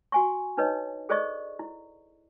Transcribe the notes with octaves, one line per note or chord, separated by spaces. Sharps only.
F#4 G#5 C#6
D4 D#4 B4 C#5 D#5
G#4 A4 C5 D5 D#5 C#6
E4